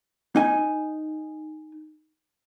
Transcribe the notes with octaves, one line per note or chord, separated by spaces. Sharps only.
D#4 G#5